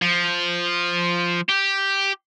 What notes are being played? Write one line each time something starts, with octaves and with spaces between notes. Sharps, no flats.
F3
G4